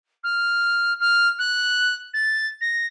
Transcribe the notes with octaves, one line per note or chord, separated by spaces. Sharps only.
F6
F6
F#6
A6
A#6